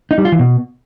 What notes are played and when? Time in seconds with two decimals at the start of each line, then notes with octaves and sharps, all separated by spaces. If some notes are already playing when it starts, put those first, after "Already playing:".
0.11 D#4
0.18 G3
0.25 F4
0.32 E3
0.39 B2